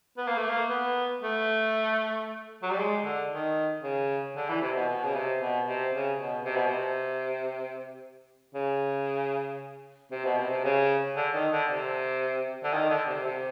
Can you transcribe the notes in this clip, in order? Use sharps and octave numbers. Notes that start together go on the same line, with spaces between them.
B3
A#3
A3
A#3
B3
A3
F#3
G3
G#3
D3
D#3
C#3
D3
E3
C3
B2
B2
C#3
C3
B2
C3
C#3
B2
C3
B2
C3
C#3
C3
B2
C3
C3
C#3
D3
D#3
D3
C3
D3
D#3
D3
C3
C3